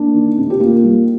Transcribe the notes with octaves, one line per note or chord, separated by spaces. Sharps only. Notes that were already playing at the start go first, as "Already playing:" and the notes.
Already playing: A#3 D4
D#3
C3
G4
A#3 F4
G3